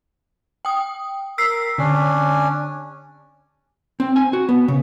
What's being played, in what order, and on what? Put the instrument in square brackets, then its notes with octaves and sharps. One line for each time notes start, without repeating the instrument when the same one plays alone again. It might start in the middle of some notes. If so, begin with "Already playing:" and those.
[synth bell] G5 D#6
[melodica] A#4 [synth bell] E6 B6 C7
[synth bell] D3 [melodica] C#4 D4
[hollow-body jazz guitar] C4
G#5
F#4
B3
C#3